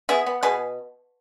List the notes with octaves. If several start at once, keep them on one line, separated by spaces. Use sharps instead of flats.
B3 E4 G#4
B3
B2 G#4 B4